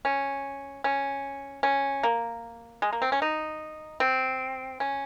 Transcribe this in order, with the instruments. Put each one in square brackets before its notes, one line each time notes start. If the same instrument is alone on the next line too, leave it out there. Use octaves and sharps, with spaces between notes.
[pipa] C#4
C#4
C#4
A#3
G#3
A#3
C4
C#4
D#4
C4
C#4